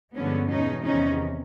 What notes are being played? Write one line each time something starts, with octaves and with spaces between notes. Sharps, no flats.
G2 D3 F3 G#3 B3 C#4
E2 B2 G#3 C#4 D#4
E2 C3 D#3 C#4 D#4